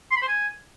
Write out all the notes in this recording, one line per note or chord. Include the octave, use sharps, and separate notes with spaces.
C6
B5
C5
G#5